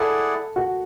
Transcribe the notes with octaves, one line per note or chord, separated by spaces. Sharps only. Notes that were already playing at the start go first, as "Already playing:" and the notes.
Already playing: E4 G#4 A4 D5 F#5
F#4